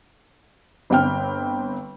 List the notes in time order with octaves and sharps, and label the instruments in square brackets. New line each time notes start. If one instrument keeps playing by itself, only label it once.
[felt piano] G1 C4 G5 F6